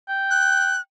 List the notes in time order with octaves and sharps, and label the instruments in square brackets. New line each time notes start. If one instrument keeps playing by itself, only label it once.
[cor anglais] G5
[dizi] F#6